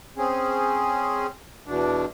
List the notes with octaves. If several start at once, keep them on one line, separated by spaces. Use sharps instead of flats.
C4 C#4 G#4
E2 B2 D4